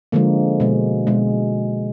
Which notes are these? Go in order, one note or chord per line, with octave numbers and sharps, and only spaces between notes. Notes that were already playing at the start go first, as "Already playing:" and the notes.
D3 F3 G#3 A#3
B2 G#3
B2 G#3